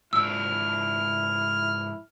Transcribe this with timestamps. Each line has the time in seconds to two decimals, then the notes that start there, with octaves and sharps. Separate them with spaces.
0.13 G#2 F3 D4 E4 E6 F6